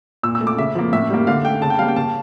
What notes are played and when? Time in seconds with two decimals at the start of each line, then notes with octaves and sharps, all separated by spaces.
0.23 A#2 E6
0.35 E6
0.41 A3
0.47 D6
0.58 C#3 E5
0.75 F3 A#3
0.92 A2 E5
1.10 G3 A#3
1.27 D3 F5
1.44 A3 G5
1.62 C#3 A5
1.70 G5
1.79 G3 F5
1.82 A#3
1.88 G5
1.96 C#3 A5